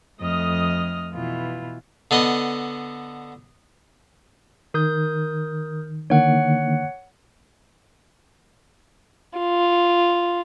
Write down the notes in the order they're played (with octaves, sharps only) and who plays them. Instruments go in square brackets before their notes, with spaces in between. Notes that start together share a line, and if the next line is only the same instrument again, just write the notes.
[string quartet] F2 A3 D#5 D#6 F6
B2 E3 F4
[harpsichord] D3 B3 D#5
[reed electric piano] D#3 [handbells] A#4 D#6 G6
[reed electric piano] D3 D#3 A#3 [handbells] C#5 F#5 F#6
[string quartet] F4